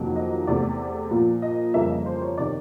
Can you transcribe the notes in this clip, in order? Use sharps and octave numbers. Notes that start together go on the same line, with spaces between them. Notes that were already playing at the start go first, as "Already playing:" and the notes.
Already playing: F2 C3 D#3 F#3 A#3
D#5
E2 C3 E3 A3 D5
A#2 F3 A#3
D#5
F2 C#3 E3 G3 A#3 E5
D#5
C5
C#5
C3 D#3 D5